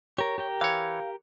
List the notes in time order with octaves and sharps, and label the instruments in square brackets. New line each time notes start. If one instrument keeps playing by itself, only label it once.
[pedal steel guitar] G4 A#4 [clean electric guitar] C#5
[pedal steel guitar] G4 A#4 G5
[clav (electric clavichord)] E3 C#5 [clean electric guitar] F5